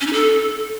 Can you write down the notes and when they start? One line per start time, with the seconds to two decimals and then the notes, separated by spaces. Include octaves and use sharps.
0.01 C#4
0.07 D#4
0.13 A4